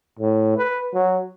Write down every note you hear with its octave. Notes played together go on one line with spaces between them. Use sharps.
A2
B4
F#3